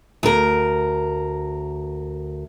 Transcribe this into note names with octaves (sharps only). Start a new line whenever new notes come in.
D2 A#4